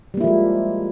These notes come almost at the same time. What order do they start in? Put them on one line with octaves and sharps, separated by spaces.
G3 A#3 E4 F3 G#3